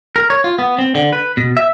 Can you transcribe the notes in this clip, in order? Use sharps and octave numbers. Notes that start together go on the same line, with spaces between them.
A#4
C#5
F4
B3
C4
D3
B4
B2
E5